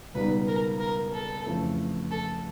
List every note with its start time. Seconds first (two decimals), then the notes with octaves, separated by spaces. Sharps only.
0.14 C#2 B2 G3 B3 D#4 B4
0.48 A#4
0.80 A#4
1.13 A4
1.46 F2 C#3 E3 A3
2.11 A4